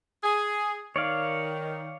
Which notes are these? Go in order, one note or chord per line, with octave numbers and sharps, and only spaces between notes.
G#4
D#3 C#5 D5 F5